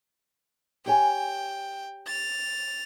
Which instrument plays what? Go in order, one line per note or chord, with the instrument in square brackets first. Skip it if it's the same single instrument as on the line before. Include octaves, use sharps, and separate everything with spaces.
[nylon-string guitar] G4 C#5 G#5 [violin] G5
[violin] A6 F7